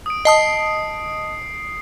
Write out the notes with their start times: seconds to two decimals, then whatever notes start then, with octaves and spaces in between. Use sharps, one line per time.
0.06 D#6 D7
0.25 D#5 A5 D#6 C7